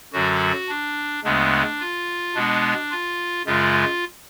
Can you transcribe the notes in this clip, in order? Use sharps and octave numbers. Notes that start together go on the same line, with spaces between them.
F#2 D3 F#3 F#4
D4
D2 C#3 G#3 B3 D4
F4
B2 G#3 B3 D4
F4
F#2 C#3 G#3 F4